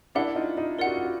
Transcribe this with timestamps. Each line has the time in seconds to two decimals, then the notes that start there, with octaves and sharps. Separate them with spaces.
0.15 D4 E4 A#4 D5 F#5
0.36 D#4 F4
0.57 D#4 F4
0.78 F4 A#4 D5 F#5
0.87 F#4
0.96 F4
1.05 F#4